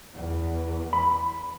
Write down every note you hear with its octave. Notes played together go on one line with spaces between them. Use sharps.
E2
B5